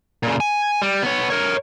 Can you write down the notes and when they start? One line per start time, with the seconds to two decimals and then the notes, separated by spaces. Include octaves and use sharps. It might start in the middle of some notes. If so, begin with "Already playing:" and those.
0.23 A#2 C#3
0.40 G#5
0.82 G3
1.02 B3 C#5
1.30 A#4 C#5